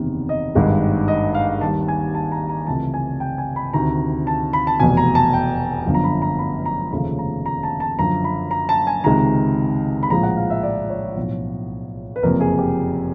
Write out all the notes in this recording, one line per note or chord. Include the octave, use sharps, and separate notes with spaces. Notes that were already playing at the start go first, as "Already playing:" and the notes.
Already playing: F#1 E2 C3 D#3
D#5
G#1 G2 D#3 G#3
D#5
F5
D#2 D#3 G3 A5
G#5
A5
A#5
A#5
C#2 C3 E3 A3 A5
G#5
G5
G#5
B5
D2 C3 D#3 A#5
A5
B5
A5
F1 E2 B2 G#5
A#5
A5
G5
G1 F#2 D3 F3
A#5
B5
A#5
B5
A#5
F1 D#2 C#3 F3 A3 A#5
A#5
A#5
A5
A5
F#2 D3 F3 A#5
B5
A#5
A5
G#5
C#2 C3 D#3 G#3 A#5
B5
A#1 A2 F3 G#3 A#5
F#5
F5
E5
D5
C#5
B1 A2 F3
B4
F#1 F2 C3 A#4
G#4
G4